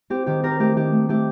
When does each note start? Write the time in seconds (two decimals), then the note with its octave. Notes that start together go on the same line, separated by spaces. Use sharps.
0.10 C4 G4
0.26 D#3 G4
0.43 C4 G4 A#4
0.59 A3 G4
0.76 D#3 G4
0.93 A3
1.09 A3 G4